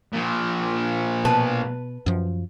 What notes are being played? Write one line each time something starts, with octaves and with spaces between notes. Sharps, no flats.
A#2 F3
B2 B4 A5
F#2 F3